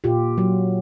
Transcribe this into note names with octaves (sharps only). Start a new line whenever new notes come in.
A#2 F4 G4
F#3